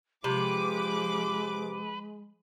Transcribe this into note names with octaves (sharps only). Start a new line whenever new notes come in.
C3 F3 G#3 B4 D6